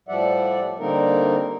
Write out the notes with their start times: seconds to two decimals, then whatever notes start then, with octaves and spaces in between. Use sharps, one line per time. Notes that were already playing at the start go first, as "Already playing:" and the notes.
0.08 A2 F3 G3 D5 E5 F#5
0.79 D3 G3 A#3 C4 D#4 A#4